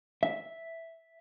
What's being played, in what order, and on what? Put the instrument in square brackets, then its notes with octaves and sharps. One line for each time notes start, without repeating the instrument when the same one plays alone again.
[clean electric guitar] E5